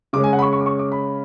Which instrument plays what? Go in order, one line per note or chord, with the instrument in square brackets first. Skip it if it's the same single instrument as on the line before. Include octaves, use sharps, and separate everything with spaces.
[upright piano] C#3 G#3 C#4 D6
G#5
F#5
B5
C#6
C#6
D6
C#6
D6
B5